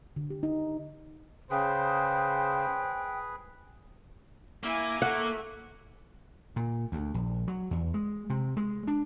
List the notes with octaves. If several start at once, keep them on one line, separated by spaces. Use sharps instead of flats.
D3
G4
D#4
C#3 G#4 B4 C5 G5
A#3 E4 G#5
A3 F#5
A#2
D2
A#1
F#3
E2
G#3
C3
G#3
D4